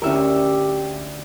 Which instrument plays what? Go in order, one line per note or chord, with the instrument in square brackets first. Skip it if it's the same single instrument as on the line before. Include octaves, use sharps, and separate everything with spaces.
[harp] D2 E5 [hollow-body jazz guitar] C#4 E4 A#4 [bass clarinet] G4